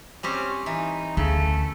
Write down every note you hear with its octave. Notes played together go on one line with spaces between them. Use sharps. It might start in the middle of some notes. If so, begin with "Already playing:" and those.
G3 C4 C#4 G4
E3 D#4
D2 C#3 A3